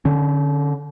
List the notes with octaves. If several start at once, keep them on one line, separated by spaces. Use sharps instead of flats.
D3 C#4